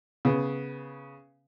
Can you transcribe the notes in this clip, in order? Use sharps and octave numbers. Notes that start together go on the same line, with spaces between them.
C#3 B3